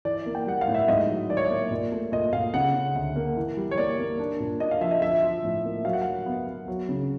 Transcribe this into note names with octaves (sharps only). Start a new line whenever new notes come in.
E3 D5
A#3
G5
G3 F#5
F5
A2
E5
G#2 D#5
F#3
D#3 D5
C#5
D5
A#3
A#2
A3
A#2 D#5
A#2 F5
C#3 F#5
C#3
D2
A#3
E3
G3
C#5
A#3 D5
A#3
D4
A#2
D4 D#5
F5
F3 E5
D#5
F3 E5
F3
A2
A#3
F#3 F5
F#5
F#3 F5
B3
B3
F#3
C#3